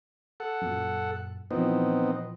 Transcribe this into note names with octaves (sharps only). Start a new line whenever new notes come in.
A4 F#5
F#2 A#2
A#2 E3 F3 B3 C4 D#4